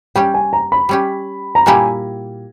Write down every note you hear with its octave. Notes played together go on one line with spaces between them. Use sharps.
G3 C#4 G4 G5
G#5
A#5
B5
G3 C#4 G4
A#5
A#2 G3 A#3 E4 G4 G#5